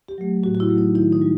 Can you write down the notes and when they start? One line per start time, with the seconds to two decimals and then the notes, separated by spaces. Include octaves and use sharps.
0.08 G4
0.18 F#3 A3
0.43 A2 F#4
0.55 F#4
0.60 E4
0.69 F#3 A3
0.78 D#4
0.95 D#3 E4
1.12 D#4
1.22 G3